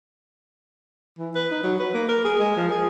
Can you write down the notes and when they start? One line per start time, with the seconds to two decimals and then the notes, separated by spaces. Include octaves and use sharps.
1.18 E3
1.35 B4
1.51 D#4
1.63 F#3
1.79 B4
1.94 A#3
2.09 A#4
2.24 G#4
2.39 G#3
2.56 F3
2.71 G#4